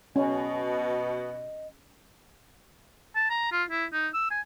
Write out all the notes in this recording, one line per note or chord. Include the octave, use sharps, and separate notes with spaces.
B2 C#4 D#5
A5
A#5
F4
E4
D#4
E6
G#5